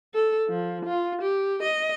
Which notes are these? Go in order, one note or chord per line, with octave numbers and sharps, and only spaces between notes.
A4
F3
F4
G4
D#5